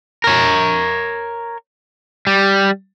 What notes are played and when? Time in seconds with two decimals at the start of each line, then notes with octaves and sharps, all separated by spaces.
0.24 A#4 C#5
2.27 G3